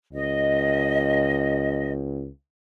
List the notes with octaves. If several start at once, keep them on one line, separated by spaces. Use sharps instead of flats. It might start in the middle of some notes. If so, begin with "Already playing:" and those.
C#2 D#5